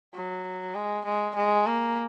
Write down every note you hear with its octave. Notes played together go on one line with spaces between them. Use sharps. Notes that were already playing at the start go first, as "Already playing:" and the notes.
F#3
G#3
G#3
G#3
A#3